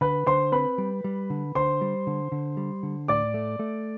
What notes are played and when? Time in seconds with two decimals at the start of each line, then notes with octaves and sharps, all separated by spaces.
0.01 D3 B4 B5
0.27 D3 C5 C6
0.52 C4 B4 B5
0.78 G3
1.04 G3
1.30 D3
1.55 D3 C5 C6
1.81 G3
2.07 D3
2.32 D3
2.57 G3
2.83 D3
3.08 A2 D5 D6
3.34 A3
3.59 A3